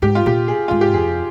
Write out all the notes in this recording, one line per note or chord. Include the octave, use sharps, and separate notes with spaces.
G#2 G4
F4
A#2 G4
G#4
G#2 F4
G4
F2 G#4